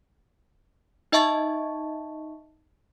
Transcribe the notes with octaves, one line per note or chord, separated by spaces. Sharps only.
D#4 D#5 E5 A5 C#6 A6